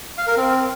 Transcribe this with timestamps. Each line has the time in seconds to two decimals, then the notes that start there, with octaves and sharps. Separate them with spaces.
0.18 F5
0.27 A#4
0.37 C4